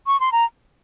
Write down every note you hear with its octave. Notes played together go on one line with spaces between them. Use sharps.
C#6
C6
A#5